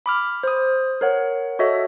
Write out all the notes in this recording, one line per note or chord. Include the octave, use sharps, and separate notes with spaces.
B5 D6 F6
C5 D#6
A#4 C#5 F#5
F#4 A4 C#5 D#5 E5